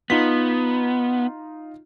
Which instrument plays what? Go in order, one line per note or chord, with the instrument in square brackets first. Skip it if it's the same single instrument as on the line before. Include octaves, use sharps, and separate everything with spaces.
[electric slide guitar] B3 [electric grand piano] D#4 F4 B6